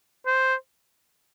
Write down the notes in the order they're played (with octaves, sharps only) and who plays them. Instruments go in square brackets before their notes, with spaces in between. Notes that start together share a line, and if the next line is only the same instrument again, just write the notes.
[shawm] C5